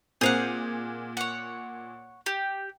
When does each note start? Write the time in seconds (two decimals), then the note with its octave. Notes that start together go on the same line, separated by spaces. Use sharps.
0.21 A#2 C4 G#4 A#4 C5 F5 F#5 G6
1.17 C#5 F#5
2.26 G4